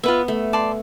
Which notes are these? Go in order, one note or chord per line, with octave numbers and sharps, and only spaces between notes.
B3 F4 B4 E5
A3
D5 A5 C6